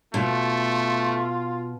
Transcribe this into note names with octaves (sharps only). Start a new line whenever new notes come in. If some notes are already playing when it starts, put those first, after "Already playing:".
B2 A3 F4